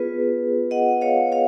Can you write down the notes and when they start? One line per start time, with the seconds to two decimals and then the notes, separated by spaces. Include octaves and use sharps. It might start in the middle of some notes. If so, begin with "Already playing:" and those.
Already playing: B3 F4 G#4 B4
0.71 D#5 F#5
1.01 C#5 F5
1.32 C#5 F5